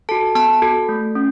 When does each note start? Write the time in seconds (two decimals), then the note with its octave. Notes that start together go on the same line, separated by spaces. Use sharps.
0.09 F#4 A4 A5
0.35 B3 A5
0.62 F#4 A4
0.89 A3
1.15 C#4